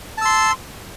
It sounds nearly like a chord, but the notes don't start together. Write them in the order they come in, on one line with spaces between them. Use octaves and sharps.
A5 E6 C6